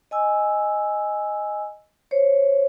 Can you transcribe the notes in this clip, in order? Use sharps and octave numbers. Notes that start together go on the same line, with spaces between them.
D#5 G#5 E6
C5 C#5